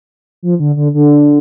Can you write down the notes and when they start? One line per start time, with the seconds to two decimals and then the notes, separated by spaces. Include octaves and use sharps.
0.43 F3
0.60 D3
0.76 D3
0.94 D3